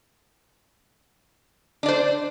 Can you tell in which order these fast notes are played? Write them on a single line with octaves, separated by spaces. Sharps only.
D4 D5 C5